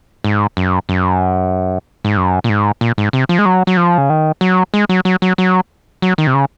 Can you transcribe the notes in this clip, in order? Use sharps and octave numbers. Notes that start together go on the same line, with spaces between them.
G#2
F#2
F#2
G#2
F#2
A#2
G#2
A#2
G#2
C3
F3
G#3
F#3
F#3
F3
C#3
D#3
F#3
G#3
F#3
F#3
F#3
F#3
F#3
D#3
C3
C#3